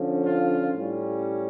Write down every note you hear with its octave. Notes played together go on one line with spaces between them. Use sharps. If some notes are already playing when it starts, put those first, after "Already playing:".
Already playing: D3 F3 C#4
F4
A2 G3 C#4